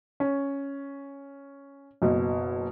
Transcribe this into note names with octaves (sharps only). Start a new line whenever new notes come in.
C#4
F#1 B2